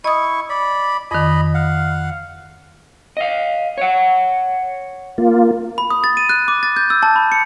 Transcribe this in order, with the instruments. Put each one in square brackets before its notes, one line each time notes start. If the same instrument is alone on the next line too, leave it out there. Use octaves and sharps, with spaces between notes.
[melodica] E4 C#6 [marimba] D#5 D#6
[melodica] D5 B5
[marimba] F2 D#3 [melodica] D#5 B5
[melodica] F5 F#5
[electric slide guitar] D#5 F5
C#5 F#5
[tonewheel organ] A#3 F4
[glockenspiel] B5
D#6
A6
D#7
F#6
D6
A6
G6
E6
A5
B5
C#7